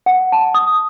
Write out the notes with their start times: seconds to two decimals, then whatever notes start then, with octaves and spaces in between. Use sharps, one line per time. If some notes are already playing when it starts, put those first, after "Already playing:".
0.06 F#5
0.32 A5
0.55 D#6